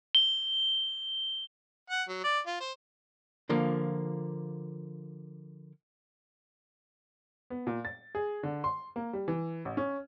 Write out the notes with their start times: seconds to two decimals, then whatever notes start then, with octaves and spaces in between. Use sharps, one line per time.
0.15 G7
1.90 F#5
2.09 F#3
2.24 D5
2.47 F4
2.60 C5
3.49 D3 F3 A#3 F4
7.50 B3
7.67 A#2
7.85 A6
8.15 G#4
8.43 D3
8.64 C6
8.96 A#3
9.13 G3
9.28 E3
9.65 A1
9.77 C#4